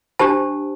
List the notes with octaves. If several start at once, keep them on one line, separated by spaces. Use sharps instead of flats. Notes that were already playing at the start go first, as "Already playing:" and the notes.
D4 G4 C5 A5